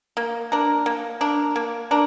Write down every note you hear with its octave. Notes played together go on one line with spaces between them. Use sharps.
A#3
D4 A#4
A#3
D4 A#4
A#3
D4 A#4